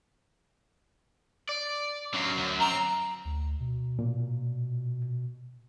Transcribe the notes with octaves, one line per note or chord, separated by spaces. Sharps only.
D5
F#2 F#3 D4 F5
D2
C4 A#5
D2
B2
A#2